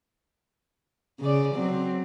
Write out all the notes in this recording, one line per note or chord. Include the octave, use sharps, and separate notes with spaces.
C#3 D5
F#3 C4